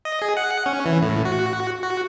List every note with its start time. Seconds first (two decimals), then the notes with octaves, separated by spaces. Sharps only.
0.05 D#5
0.22 G#4
0.37 F#5
0.66 C#4
0.86 E3
1.02 A2
1.25 F#4
1.83 F#4